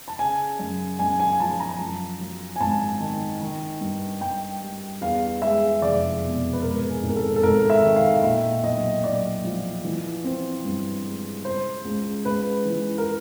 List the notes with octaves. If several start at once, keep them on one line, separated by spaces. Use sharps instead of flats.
A5
C#3 G#5
F#2
F#2 G#5
G#5
F3 A5
A#5
F#2
F#3
G#5
G#1 A5
D#3
D#3
G2
G2 G5
G3
E2 F5
G#3 E5
F1 D5
B2
B4
G#2 A#4
G#4
G#1
A#4
A4
A4
G#1 A#4
E5
D#3
F5
F5
A#2 E5
B1 D#5
B1 D5
F3
E3
C4
G2
G#3
C#3 C5
C#2
C#2 B4
E3
A#4